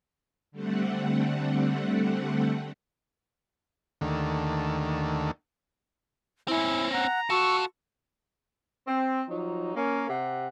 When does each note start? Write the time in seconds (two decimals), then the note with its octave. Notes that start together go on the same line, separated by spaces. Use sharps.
0.52 D3 G3 A3 C4 F#5
4.01 D#2 D3 D#3 A3
6.48 C4 C#4 E4
6.92 F#5 A#5
7.30 F4 F#4 A4 C#6 E6
8.88 C4
9.29 F3 F#3 D#4
9.75 A#3 C#4
10.09 C3 F#5